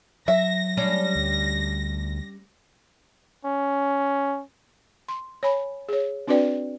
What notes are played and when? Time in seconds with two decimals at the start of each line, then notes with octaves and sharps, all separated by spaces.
0.28 F#3 E5 A#6
0.77 G3 C#4 D4
1.15 D2
3.45 C#4
5.08 C6
5.43 C#5 G#5 B5
5.89 G#4 C#5
6.27 C4 D4 F#4 B4 D5 G5